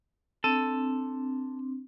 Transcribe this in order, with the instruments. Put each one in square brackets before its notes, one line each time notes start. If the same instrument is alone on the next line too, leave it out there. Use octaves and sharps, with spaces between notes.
[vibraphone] C4 D4 [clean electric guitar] A4